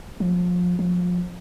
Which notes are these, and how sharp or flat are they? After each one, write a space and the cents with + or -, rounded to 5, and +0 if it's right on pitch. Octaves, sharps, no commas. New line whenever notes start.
F3 +30
F3 +30